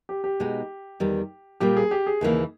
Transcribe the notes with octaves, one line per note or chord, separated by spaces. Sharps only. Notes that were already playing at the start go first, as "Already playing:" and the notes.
G4
G4
B2 G#3 D#4
E2 D#3 G3
A#2 G3 A#3 G4
G#4
G4
G#4
D#2 C#3 E3 A#3